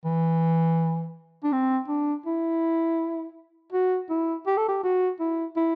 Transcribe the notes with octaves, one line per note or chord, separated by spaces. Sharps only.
E3
D4
C4
D4
E4
F#4
E4
G4
A4
G4
F#4
E4
E4